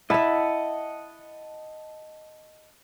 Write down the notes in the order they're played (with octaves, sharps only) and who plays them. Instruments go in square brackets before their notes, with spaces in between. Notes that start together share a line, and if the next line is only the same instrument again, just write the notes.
[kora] E4 E5 [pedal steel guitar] D#5 F#5 A5